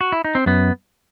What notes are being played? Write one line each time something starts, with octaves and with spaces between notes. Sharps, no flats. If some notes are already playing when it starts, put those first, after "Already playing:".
F#4
E4
D#4
C4
F#2 B3